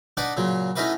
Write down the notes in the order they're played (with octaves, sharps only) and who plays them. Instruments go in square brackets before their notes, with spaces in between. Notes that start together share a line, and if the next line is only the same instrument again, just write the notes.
[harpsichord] D4 D#4 B4 D5 F#5
A#2 C#3 F#3
A3 C#4 D#4 E4 F#4 B4